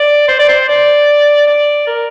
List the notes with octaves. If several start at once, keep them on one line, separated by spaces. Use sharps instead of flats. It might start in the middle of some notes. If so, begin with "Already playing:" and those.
Already playing: D5
C5
D5
C5
D5
D5
A#4